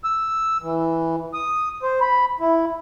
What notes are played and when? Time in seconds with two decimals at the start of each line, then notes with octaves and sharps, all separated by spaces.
0.04 E6
0.62 E3
1.34 D#6
1.83 C5
2.01 B5
2.40 E4